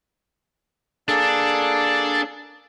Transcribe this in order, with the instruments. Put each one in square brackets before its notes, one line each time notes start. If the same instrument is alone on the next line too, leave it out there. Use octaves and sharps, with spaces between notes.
[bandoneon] A#3 G#4 A4 [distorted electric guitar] D4